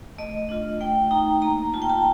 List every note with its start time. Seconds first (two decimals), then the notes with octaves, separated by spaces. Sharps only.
0.18 A3 D#5
0.49 D4 F4
0.80 A3 G5
1.11 D#4 A#5
1.42 A#3 A#5
1.74 F4 A5
1.82 G5
1.90 A5